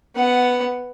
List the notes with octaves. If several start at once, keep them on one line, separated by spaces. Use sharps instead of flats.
B3 F#5